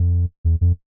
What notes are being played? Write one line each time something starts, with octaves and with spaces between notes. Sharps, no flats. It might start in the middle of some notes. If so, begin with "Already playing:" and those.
Already playing: F2
E2
F2